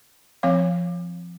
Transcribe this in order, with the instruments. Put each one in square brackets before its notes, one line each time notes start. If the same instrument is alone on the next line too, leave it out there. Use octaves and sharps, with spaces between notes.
[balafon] F3 C4 C#5 F5